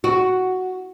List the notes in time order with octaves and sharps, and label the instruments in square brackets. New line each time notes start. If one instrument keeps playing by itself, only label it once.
[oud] F#4